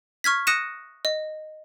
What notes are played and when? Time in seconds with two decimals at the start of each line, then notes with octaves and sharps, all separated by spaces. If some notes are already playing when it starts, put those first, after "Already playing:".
0.24 C#6 F6 G#6 B6
0.47 D#6 F#6 A#6 C#7 D#7 E7
1.05 D#5